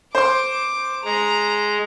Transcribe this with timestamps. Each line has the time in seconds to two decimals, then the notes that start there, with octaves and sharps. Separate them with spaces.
0.15 C5 C6 D6
1.05 G#3 A#5